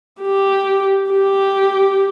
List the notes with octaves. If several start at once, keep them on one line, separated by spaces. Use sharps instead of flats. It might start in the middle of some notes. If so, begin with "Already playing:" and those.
G4
G4